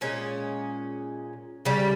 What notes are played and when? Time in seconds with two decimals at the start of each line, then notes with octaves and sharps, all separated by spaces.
0.01 A#2 G#3 C#4
1.65 C#3 G3